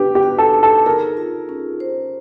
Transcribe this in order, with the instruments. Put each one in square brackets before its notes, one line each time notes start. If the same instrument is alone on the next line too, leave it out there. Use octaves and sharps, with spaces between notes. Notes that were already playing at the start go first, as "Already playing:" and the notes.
Already playing: [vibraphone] D4 B4 [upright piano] G4
[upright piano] G4
[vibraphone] F#4
[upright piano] A4
[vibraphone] D#4
[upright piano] A4
[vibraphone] G#4 [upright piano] A#4
[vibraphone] F4
C#4
C5